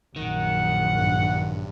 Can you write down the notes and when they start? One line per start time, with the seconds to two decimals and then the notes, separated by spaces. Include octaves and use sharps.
0.16 A#1 F#2 D#3 F#5
0.98 G2